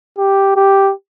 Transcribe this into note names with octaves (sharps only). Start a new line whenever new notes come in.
G4
G4